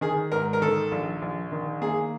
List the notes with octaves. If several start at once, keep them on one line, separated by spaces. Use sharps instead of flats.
D#3 G#4
G#2 A#4
A#4
D#3 A4
A#1
A#1
D#3
A#3 G#4